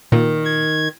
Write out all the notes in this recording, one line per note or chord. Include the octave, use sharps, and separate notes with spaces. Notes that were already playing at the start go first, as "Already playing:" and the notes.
A#2 D#3
G#6